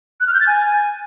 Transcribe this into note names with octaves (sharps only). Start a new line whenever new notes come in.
F#6
F6
G6
A6
G#5